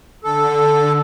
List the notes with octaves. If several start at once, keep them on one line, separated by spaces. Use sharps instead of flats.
D3 A4